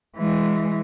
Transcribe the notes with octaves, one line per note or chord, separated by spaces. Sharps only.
E3 G#3